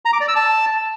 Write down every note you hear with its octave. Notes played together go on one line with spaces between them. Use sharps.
A#5
D6
D5
E6
A5